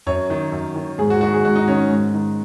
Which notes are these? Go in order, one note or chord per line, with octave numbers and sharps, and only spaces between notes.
F#2 C#5
D#3
F#2
D#3
G#2 G#4
F#4
D#3 F#4
G#4
G#2 F#4
D#4
D#3 C#4
G#2
D#3